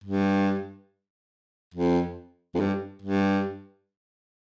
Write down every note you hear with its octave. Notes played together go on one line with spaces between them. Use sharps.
G2
F2
F2
G2
G2